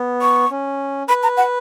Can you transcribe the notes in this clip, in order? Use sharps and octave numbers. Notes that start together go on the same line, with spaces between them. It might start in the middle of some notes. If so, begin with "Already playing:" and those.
Already playing: B3
C#6
C#4
B4 B5
A#5
F#5